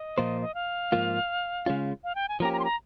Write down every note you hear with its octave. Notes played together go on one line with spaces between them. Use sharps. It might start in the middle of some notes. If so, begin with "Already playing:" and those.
Already playing: D#5
A#2 F3 A#3 F4 C5
D#5
F5
G#2 F3 A#3 F4
C#3 G#3 C#4 F4
F5
G5
G#5
F3 A#3 C#4 G4 A#5
A#5
C6
A#5